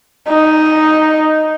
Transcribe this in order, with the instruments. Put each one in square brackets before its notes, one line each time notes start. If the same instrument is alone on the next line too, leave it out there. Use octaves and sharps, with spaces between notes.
[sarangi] D#4